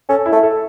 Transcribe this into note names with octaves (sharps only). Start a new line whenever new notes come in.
C#4 A4
E4
A3
A4